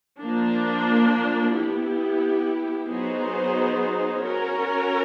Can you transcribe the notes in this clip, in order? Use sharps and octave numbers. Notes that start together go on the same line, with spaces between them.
F3 A#3 D4
B3 E4 G4
F#3 B3 D#4 G#4 C5
C#4 F#4 A#4